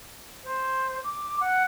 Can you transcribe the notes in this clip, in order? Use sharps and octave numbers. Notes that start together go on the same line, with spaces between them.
C5
D6
F#5